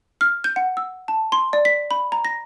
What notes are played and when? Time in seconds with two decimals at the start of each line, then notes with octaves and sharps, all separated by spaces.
0.21 F6
0.44 G6
0.56 F#5
0.77 E6
1.08 A5
1.32 C6
1.53 D5
1.65 B6
1.91 B5
2.12 A#5
2.25 A#6